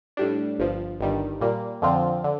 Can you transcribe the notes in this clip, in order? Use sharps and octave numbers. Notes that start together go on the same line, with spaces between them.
A2 G3 D4
G1 G2 F3
G1 G2 D#3 G3
A#2 G3 A#3
F2 D3 F3 C4 F4
D3